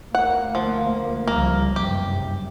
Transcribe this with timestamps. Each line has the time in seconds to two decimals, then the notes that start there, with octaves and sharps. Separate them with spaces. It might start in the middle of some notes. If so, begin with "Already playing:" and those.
0.15 D2 A#3 F#5
0.55 F3
1.28 C#2 F3 G3 A#3
1.76 F#1 G2 C3 G4